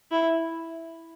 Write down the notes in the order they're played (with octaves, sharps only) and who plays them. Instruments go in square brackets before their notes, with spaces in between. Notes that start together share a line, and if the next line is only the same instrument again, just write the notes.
[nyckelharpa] E4